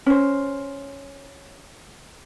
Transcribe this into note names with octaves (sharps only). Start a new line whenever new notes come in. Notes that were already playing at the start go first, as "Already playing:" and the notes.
C#4 C5